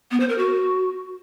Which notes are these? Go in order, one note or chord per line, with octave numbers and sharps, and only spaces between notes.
B3
C5
A#4
F#4